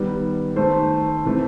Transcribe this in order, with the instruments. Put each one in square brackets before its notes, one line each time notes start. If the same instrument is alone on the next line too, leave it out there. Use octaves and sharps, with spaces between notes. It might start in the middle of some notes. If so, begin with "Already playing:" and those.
Already playing: [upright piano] D#3 G3 B3
D#3 A3 C5
C3 E3 A3